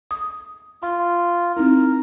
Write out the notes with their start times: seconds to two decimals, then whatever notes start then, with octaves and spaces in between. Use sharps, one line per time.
0.11 D#6
0.83 F4 C6
1.57 C4 D#4 E4 A#4